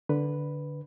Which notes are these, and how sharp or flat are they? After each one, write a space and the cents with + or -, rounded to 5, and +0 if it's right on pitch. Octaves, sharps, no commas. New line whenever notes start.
D3 +0 B4 +0